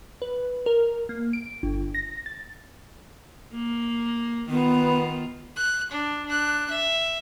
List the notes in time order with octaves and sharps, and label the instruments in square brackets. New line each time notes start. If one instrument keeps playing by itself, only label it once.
[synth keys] B4
A#4
A#3
D7
G1
A#6
A6
[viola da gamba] A#3
[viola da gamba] D#3 F4 [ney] B3
[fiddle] F#6
D4
D4 F#6
E5